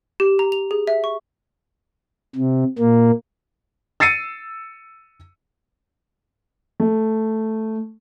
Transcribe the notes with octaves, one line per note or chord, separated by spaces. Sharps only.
G4
A#5
F7
G#4
E5
C#6
C3
A#2 A#3
E6 A6 C7 C#7 D#7
A3